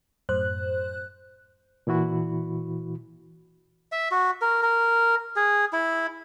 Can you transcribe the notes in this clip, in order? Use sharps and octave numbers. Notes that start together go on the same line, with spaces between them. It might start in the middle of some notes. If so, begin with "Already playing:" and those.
F#2 A2 C5 F#6
A#2 E3 E4 F#4 B5
E5
F#4
A#4
A#4
G#4
E4